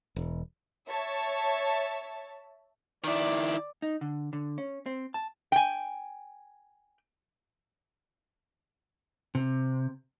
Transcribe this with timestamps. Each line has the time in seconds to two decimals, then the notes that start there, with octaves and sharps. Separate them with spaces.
0.16 E1
0.87 C#5 E5 A5
3.04 D#3 E4 D5 D6
3.82 D#4
4.01 D3
4.33 D3
4.58 C#4
4.86 C4
5.14 A5
5.52 G5 G#5
9.35 C3